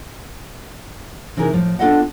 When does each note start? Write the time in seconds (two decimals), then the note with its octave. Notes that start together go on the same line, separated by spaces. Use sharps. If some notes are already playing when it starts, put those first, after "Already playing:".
1.37 C3 E3 D#4 G#4 A#4
1.53 A2 F3
1.79 B3 D4 F4 A4 D#5 F#5